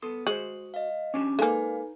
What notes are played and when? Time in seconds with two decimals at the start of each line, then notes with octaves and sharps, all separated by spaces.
0.02 B3 A4 C6 D#6
0.27 G#3 F#4 C5 F#7
0.74 D#5 F5
1.14 C#4 D4 G4 D6
1.39 G#3 A#3 D#4 A4 B4 D5 F5 G#5